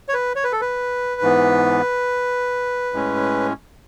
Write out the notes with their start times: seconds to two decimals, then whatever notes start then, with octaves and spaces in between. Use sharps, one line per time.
0.08 C#5
0.14 B4
0.36 C#5
0.44 B4
0.52 A4
0.61 B4
1.21 G#2 E3 B3
2.93 A2 G#3 C#4